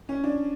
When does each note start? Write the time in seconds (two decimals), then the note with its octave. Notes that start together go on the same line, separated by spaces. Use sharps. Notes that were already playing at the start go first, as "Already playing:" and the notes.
0.09 C#4
0.24 D4